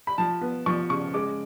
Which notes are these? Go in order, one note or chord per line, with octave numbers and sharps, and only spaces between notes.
B5
F3 A5
B3
F3 C#6
C#3 C#6
G#3 D6